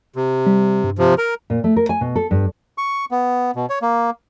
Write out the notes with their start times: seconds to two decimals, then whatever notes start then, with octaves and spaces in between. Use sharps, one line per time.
0.16 C3
0.47 G3
0.84 G2
0.99 C3 F3
1.18 A#4 A#5
1.50 A#2
1.64 A3
1.76 A#4
1.89 G#5
2.01 B2
2.16 A4
2.31 G2
2.78 C#6
3.11 B3
3.56 B2
3.70 C#5
3.82 A#3